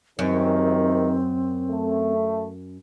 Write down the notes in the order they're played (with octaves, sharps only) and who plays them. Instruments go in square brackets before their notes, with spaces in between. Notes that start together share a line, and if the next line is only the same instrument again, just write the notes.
[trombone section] C#2 C3 D#3 [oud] F#2 [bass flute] C4
[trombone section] A3